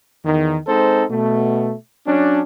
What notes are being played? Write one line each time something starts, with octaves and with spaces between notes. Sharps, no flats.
E2 D#3
G#3 C4 D#4 A4 C5
B2 A3
F#3 C#4 D4